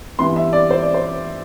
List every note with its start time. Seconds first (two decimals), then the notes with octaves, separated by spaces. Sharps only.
0.19 G2 E3 G3 B3 C6
0.36 E5
0.53 D5
0.70 C5
0.83 D5
0.94 C5